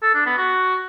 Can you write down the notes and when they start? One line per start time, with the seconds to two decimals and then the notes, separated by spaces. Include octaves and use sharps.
0.03 A4
0.14 D4
0.26 B3
0.38 F#4